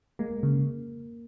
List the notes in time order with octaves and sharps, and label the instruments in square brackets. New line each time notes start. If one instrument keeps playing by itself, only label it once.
[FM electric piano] G#3 [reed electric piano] A#3
[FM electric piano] C#3